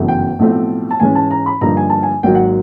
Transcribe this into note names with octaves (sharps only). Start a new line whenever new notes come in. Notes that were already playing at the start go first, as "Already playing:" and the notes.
Already playing: G1 F#2 C#3 E3 A3
G5
B1 A2 F3 A3 C4
A5
G#2 E3 G#3 C#4 G#5
A5
A#5
B5
G2 D3 F3 A#3 D#4 A#5
G#5
A5
G#5
G#1 G#2 D#3 F#3 A#3 G5
F#5